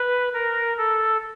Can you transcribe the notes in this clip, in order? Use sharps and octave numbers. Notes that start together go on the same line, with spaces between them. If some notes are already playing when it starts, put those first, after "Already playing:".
Already playing: B4
A#4
A4